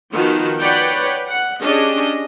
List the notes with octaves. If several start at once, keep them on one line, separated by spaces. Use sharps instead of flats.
D#3 F3 B3 F#4
B4 C#5 D5 F#5 G5 B5
F#5
C#4 D4 G4 G#4 D#5